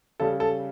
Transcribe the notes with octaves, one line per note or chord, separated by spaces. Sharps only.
C#3 G3 A4
A4